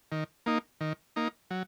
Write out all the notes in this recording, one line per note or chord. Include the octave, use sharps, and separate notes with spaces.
D#3
A#3 D#4
D#3
A#3 D#4
F#3